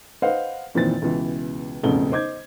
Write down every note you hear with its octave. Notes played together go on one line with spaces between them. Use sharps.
B4 C5 D#5 F5 F#5
F2 A#2 D#3 E3 C5 A6
C#2 B2 E3
E1 A1 F2 C#3 A4 G7
C5 D#5 D6 G6 G#6